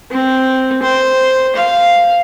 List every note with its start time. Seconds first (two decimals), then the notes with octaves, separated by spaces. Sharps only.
0.11 C4
0.82 C5
1.56 F5